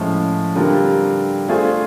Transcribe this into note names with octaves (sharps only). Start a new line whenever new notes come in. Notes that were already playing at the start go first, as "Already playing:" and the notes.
Already playing: A2 F3 G#3 C#4
D3 G3 C4 F4 A#4
A3 D4 F4 G#4 C5